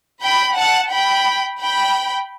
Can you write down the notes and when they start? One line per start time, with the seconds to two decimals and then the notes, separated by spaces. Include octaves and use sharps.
0.21 G5 B5
0.56 F#5 A5
0.91 G5 B5
1.61 G5 B5